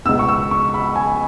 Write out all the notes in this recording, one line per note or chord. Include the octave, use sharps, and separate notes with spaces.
C#2 B2 B3 E6
C#6
E6
C#6
B5
G#5